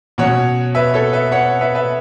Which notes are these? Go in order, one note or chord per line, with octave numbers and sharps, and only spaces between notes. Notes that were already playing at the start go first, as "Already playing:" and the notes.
B2 F#3 C#4 C#5 F#5
B4 E5
A4 C#5
B4 E5
C#5 F#5
B4 E5
B4 E5